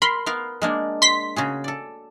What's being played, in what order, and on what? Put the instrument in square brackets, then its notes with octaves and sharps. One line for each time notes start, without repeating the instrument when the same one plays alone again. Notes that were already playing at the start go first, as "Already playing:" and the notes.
[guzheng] A#4 [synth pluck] B5 C6
[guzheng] B3 A#4 F5
G#3 A#3 D4
[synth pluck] C6 B6
[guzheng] C#3 F#4 G#4
A4 D5